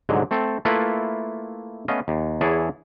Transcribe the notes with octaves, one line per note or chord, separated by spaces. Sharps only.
C2 G#2 D3 F#3
A3 C4 A4
A3 A#3 E4 F4 A4 B4
A3 B3 C#4 D#5 F5
D#2
E2 E3 E4 G#4 C#5 A5